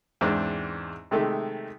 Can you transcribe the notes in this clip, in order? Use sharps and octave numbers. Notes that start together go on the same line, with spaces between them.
E2 G#2 C4 D4
C3 D#3 G#3 A3